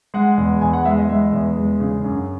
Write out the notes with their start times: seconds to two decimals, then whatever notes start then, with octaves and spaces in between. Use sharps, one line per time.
0.14 G#3 F#5
0.38 E2
0.61 E2 G#5
0.73 F#5
0.85 G#3 E5
0.98 D#5
1.08 G#3 E5
1.32 E2
1.57 G#3
1.80 C#3
2.04 F#2